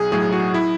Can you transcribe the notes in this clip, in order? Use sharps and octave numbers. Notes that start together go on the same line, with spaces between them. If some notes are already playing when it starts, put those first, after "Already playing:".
Already playing: B1 G#4
A2 F#3 G#4
F#4
E4